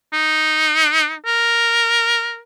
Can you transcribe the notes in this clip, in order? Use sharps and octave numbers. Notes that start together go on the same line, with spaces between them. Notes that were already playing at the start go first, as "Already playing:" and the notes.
D#4
A#4